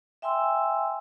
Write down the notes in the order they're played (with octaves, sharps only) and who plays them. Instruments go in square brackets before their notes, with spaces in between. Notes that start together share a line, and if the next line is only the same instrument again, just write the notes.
[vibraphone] E5 G5 G#5 C6 E6